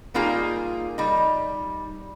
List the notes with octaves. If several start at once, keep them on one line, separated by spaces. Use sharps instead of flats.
G3 A#3 D#4 F4 G4 G#4
G3 D#4